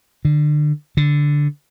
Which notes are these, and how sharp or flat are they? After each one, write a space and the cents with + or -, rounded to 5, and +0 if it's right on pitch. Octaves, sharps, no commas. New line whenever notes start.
D3 +30
D3 -5